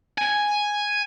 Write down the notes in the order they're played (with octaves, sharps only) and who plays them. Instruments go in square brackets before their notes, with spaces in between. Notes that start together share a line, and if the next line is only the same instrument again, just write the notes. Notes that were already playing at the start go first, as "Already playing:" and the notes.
[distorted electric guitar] G#5